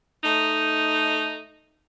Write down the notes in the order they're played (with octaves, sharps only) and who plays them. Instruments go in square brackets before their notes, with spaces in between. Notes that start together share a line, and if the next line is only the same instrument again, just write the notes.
[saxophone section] A3 D#4